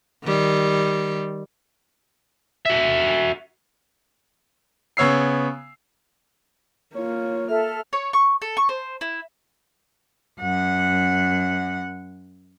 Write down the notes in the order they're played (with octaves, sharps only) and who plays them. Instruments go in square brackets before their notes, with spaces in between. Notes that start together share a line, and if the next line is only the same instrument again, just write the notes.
[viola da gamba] D#3 G3
[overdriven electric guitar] F#4 E5
[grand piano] C#3 B3 C#5 E6 C7
[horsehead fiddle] A#3 F4 [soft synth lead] C#5
[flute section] A4 E5 [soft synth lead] F6
[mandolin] C#5
C#6
A4
C#6
C5
E4
[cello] F#2 F#5